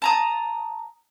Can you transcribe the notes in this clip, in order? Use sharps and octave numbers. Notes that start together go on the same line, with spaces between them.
A5 A#5 D#6